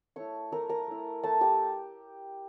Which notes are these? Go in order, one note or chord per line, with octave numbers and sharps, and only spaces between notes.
A3 E4 C#5 C#6
A3 E4 A#4 A#5
A#4 A#5
A3 E4
A3 E4 A4 A5
G4 G5